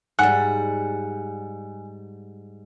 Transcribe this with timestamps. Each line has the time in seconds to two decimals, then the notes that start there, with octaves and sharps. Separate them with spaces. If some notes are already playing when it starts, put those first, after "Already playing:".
0.19 G#2 G3 F#5 G#5